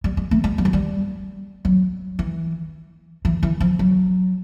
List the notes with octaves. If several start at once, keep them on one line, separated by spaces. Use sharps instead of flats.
G3
G#3
A3
G#3
G3
F#3
G3
F#3
E3
E3
E3
F3
F#3